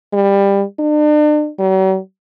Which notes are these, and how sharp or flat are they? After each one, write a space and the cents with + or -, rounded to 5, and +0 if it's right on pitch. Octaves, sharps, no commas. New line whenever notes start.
G3 +20
D4 +40
F#3 +45